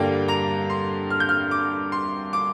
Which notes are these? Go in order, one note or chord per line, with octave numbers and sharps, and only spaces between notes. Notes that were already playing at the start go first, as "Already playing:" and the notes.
Already playing: G2 D3 G3 A#3 G5
A#5
C6
F6
G6
F6
D6
C6
D6